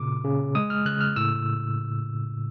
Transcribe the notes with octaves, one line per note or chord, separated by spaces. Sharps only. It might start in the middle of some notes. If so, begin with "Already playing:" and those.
Already playing: A#2 C#3 D6
C#3
G#3 D#6
F6
C#3 F#6
F6
A2 E6